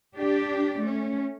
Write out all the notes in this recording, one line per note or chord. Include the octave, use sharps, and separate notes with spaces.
D4 G4 D5
A3 C#4